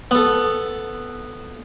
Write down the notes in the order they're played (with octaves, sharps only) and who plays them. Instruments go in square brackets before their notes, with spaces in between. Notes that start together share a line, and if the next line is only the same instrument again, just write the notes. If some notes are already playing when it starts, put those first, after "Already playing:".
[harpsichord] B3 A4